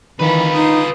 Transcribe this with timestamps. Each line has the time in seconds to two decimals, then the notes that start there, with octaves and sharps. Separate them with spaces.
0.20 D#3 E3 F4 B4 B5
0.55 D#4 C6 D#6